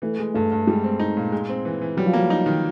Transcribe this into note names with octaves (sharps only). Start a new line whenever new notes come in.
E3 A3
G#3
G2 A3
G2
G3 G#3
C4
D#4
A#2
G#3
C4
E3
E3
F#3 G3
F3
F#3 A#3
D#4
D#3